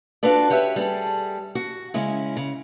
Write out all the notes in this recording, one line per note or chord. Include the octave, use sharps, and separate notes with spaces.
D4 F4 F#4 A4 B4 D5
F#4 G4 B4 C#5 E5
G3 G#4 A4
F#4
C#3 G#3 C#4 E4
C#3